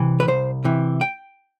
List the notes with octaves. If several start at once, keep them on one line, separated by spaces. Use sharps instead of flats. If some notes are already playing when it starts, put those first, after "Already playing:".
Already playing: C3 E3
B4
C2 C5
C3 E3
G5